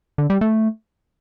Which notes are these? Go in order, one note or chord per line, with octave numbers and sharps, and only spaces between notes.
D3
G3
A3